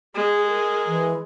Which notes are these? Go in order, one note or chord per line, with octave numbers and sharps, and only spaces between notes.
G#3 G#4
A#4
E3